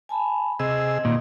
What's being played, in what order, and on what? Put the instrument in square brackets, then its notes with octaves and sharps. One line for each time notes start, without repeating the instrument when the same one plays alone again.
[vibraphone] G#5 A5 B5
[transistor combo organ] C3 G#4 E6 [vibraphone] D#5
[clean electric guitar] A#2 [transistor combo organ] D#3